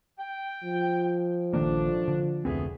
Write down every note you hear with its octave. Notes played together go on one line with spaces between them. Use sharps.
G5
F3
A#1 G#2 D#3 A3 A#3 D4
D3
F1 D2 A3 B3 C4 G#4